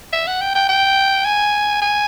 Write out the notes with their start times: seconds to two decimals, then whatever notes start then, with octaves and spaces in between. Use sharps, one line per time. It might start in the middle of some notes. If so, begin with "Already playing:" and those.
0.13 E5
0.27 F#5
0.41 G5
0.55 G5
0.69 G5
1.25 G#5
1.81 G#5